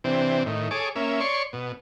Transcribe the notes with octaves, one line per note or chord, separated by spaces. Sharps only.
C3 E3 C4 D4
A2 D#3
G#4 A4 C#5 D6
A#3 C#4 E5
C#5 D5 C6 C#6
B2